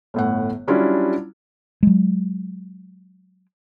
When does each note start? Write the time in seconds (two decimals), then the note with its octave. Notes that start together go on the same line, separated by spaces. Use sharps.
0.14 G1 A2 F#5
0.67 F#3 G3 C#4 D4 E4 F4
1.83 F#3 G#3